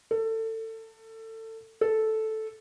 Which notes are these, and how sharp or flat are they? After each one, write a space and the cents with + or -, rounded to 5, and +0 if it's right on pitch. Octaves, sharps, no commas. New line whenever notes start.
A4 +25
A4 -5